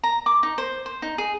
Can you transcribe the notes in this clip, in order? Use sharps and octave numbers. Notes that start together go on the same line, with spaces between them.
A#5
D6
D#4
C5
C5
D#4
G#4